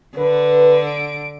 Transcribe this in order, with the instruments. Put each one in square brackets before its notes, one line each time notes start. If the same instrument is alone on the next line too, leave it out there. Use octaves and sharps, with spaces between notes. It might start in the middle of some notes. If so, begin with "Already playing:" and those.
[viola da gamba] D3 [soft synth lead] B4
[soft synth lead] D7